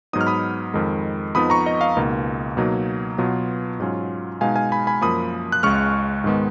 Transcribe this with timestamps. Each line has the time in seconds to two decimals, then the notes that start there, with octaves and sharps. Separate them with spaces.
0.13 G#2 F#3 B3 D#4 D#6
0.21 F6
0.27 B5 D#6
0.74 F2 D#3 G#3
1.35 F2 F3 B3 D#4 B5 D#6
1.50 A#5 C#6
1.66 D#5
1.81 F5
1.96 C#2 B2 A#3 D#4
2.57 B2 F#3 A#3 D#4
3.18 B2 F#3 B3 F4
3.80 G#2 F#3 C#4 F4
4.41 B2 G#3 D#4 F5 G#5
4.56 F5 G#5
4.72 G#5 B5
4.87 G#5 B5
5.01 F#2 F3 A#3 B5 D#6
5.52 F#6
5.63 C#2 C#3 G#3 C#6 F6
6.24 G#2 D#3 G#3 B3